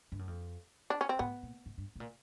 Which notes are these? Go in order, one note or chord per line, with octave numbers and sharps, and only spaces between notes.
G2
F#2
F2
D4
C#4
C4
A2 B3
A#2
G#2
G2
A2
A#2